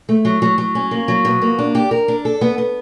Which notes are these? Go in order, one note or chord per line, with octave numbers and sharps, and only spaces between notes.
A3
F#3
F#3
F#3
C#4
A#3
F#3
B2
A#3
D4
G4
A#4
D4
A4
B3
B3